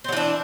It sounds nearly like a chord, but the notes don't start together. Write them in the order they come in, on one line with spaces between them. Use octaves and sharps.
C4 F#3 E3 D4